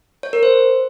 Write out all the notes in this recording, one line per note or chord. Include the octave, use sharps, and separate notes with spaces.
C#5
A#4
C5